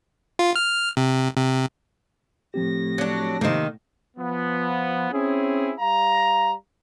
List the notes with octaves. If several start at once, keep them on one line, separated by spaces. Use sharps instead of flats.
F4
F6
C3
C3
A2 F3 C4 G4 A#6
F#3 D4
C3 D#3 A#3 C5
F3 B3
C4 C#4 E4 G#4
G3 F5 A#5